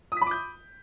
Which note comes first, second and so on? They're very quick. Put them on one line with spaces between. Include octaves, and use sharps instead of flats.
D#6 B6 B5 D6 G6